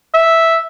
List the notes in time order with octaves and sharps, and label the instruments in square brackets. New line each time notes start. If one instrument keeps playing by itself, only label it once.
[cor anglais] E5